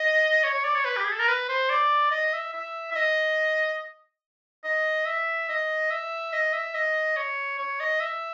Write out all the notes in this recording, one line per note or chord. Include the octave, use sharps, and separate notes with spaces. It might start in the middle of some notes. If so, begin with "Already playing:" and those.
Already playing: D#5
C#5
C#5
D5
C#5
B4
G4
G#4
A4
A#4
B4
C5
D5
D#5
E5
E5
E5
D#5
D#5
E5
D#5
E5
D#5
E5
D#5
C#5
C#5
D#5
E5